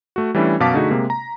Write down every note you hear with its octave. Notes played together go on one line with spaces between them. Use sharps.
A3 F#4
E3 G3 A3 C#4 D4 E4
F#2 B2 F5 A5 D6 B6
D3 A3 D#4 F#4 G#4
C3 G#3 A#3
A#5